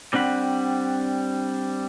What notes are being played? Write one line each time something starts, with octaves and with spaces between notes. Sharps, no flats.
G3 C4 D4 F#5 B5